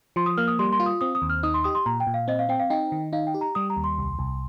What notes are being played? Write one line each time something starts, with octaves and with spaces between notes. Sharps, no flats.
F3 C6
D#6
A#3 F6
D#6
G3 C6
C6
F4
D#6
C4 D#6
D#6
D#2
F6
D#4 D#6
C6
G4 D#6
C6
A#2 A#5
G5
A#2
F5
C4 D#5
F5
C4 G5
F5
D#4 G5
D#3
D#4 F5
G5
G4
A#5
G3 D#6
A#5
D#2
C6
C2
C2